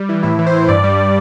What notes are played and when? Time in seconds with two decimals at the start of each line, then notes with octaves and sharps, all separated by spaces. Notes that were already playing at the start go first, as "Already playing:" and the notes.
Already playing: G3
0.09 E3
0.23 A2 E4
0.39 E3
0.46 C5
0.53 E3
0.68 G2 D5
0.84 G3